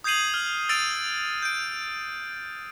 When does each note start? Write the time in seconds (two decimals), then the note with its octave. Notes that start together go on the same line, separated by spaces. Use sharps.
0.04 D#6 G6 G#6 C7 D#7 F#7
0.34 F6
0.69 E6 A6 D7 D#7 F7
1.42 G6 D7